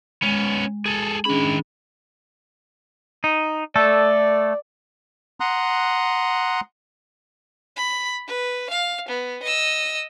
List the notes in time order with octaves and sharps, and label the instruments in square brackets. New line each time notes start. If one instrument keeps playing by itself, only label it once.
[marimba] G#3 [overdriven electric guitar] B3 C#4
[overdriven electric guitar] G#4 A4
[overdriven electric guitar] D#3 B5 [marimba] C#4 D4 G#4
[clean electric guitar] D#4
[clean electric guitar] A3 A4 [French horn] D5
[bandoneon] F#5 A#5 C6 D#6 F#6
[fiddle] B5
B4
F5
B3
D#5 E6